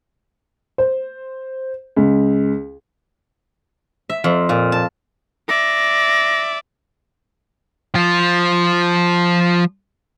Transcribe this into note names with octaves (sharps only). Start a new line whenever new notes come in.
C5
C#2
E5
F2
A#2
A5
D5 E5 A#6
F3 F4